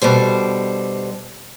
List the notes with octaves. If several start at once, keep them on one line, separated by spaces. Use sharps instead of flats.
B2 D3 G3 C5